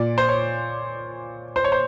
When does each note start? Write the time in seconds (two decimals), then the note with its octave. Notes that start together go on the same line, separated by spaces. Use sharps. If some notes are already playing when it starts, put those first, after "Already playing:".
Already playing: A#2 D5
0.18 C5
0.29 C#5
1.56 C5
1.64 C#5
1.72 C5